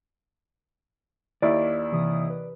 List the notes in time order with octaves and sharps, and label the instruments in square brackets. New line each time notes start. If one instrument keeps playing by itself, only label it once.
[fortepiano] D#2 E4 [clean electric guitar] D5
[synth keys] C3 E3 D#6
B4